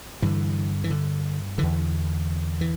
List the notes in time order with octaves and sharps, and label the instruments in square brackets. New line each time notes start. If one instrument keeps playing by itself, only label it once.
[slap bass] G2 D3 E3
E3
D3
E2 D3 E3
E3